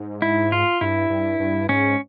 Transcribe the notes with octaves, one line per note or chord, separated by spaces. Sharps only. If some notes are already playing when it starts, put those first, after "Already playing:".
Already playing: G#2
E4
F4
G2 E4
G2
G2
G#2 C#4